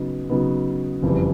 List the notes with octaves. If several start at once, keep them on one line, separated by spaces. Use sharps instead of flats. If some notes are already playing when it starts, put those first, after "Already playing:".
Already playing: C#3 F#3 B3 D#4
C#3 F#3 B3 D#4
F#1 F2 C#3 E3 G3